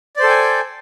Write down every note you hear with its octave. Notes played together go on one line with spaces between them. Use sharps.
A4 C5 D5 G5 G#5